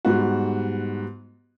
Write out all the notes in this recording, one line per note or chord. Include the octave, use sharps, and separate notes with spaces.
G#2 G3 B3 F#4